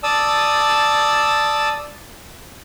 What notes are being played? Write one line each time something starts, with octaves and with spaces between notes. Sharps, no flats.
D5 A5 D#6 E6